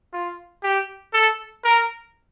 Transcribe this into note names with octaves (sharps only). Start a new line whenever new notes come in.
F4
G4
A4
A#4